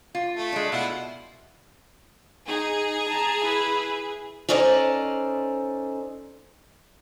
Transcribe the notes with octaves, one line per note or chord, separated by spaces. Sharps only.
F4
A3
G#3 D4
B2 E4 F4 F#5
D#4 G#4
A5 A#5
E4 B4
C#4 D#4 A4 C5 D5 D#5